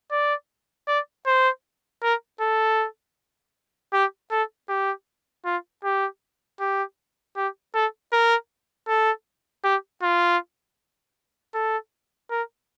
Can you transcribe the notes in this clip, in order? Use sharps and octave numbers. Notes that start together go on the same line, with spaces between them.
D5
D5
C5
A#4
A4
G4
A4
G4
F4
G4
G4
G4
A4
A#4
A4
G4
F4
A4
A#4